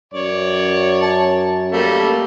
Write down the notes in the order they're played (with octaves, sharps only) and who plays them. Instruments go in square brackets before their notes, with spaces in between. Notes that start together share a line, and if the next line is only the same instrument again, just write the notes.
[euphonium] F#2 [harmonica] C#5 D5
[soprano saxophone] A5
[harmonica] G3 A3 [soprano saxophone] A#3